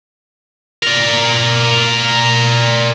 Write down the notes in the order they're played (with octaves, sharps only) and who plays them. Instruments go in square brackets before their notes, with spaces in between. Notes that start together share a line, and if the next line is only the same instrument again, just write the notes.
[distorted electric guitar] A#4 D5